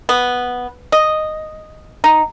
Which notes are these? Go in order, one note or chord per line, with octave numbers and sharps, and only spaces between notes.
B3
D#5
D#4